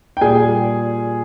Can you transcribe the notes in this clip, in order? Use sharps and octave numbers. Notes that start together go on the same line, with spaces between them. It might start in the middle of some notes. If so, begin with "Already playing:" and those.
G5
A#2 G3 G#4 G#5